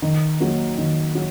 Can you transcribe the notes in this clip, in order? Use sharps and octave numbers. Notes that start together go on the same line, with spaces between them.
D#3
F#3 A#3
D#3
F#3